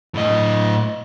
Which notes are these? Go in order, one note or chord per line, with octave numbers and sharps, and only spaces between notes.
A2 D#5